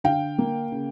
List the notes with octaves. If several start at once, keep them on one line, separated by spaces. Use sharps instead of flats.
D3 F5 G5
A#3
C#3